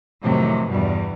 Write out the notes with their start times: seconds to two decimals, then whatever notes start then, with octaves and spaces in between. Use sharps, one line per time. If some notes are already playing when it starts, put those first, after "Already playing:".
0.23 F2 A2 C3 D#3 E3 F#3
0.69 E2 G2 B2 G3